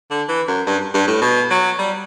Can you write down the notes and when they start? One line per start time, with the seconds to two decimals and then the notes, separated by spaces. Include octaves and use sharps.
0.11 D3
0.28 E3
0.48 F#2
0.67 G2
0.94 G2
1.08 A2
1.22 B2
1.50 F#3
1.79 G3